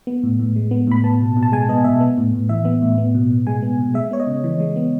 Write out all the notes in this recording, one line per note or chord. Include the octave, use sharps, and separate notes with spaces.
B3
A2
A2
G#3
B3
A2 B5
B3 A5
B2
B2
A5
G#3 G#5
B3 D#5
B2 E5
B3
A2
A2
E3 E5
B3
A2
B3
B2
B2
G#3 G#5
B3
B2
G#3 E5
B3 C#5
D#5
C#3
E3
G#3
B3